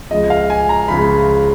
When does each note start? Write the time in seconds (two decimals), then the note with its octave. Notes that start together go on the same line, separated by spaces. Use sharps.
0.11 C#2 C#3 F3 D#5
0.30 F5
0.50 G#5
0.69 A#5
0.88 C#2 C#3 F3 B5